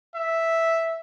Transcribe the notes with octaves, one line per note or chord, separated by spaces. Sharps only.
E5